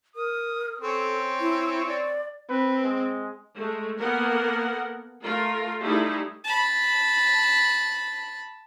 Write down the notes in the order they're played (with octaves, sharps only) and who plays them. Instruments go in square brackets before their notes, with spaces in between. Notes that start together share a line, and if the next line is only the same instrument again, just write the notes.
[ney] A#4 [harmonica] D#6
[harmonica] C4 C#4 C#5 [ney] A4
[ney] E4
D5
[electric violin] C4 [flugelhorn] B4
[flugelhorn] G#3
[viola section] G#3 A3
A#3 B3 A4 A#4 F#5
A3 F4 A#4
G3 A3 D#4 E4 G#4
[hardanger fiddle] A5 B5